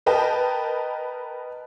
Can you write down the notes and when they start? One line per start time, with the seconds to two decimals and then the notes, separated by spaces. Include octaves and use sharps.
0.06 A#4 B4 D#5 G5 A5